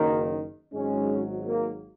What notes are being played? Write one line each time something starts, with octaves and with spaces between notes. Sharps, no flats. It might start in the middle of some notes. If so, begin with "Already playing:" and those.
Already playing: F#1 F#2 D#3 A#3 D#4
G#1 G#2 F#3 G#3 C#4
A#3